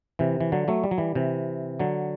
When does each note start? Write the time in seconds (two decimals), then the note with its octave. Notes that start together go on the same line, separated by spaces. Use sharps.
0.19 C3 E3
0.41 E3
0.52 D3 F#3
0.68 F#3 A3
0.84 G3
0.91 F#3
0.98 E3 G3
1.15 C3 E3
1.80 D3 F#3